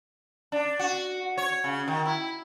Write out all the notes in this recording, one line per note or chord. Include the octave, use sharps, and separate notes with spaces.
D4
F#4
C#5
C#3
D#3
E4